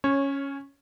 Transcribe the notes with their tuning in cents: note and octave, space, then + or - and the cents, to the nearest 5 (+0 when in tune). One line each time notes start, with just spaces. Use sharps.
C#4 +0 C#5 -15